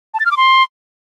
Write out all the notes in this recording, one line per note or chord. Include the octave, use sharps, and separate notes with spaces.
A5
A6
F6
D6
C6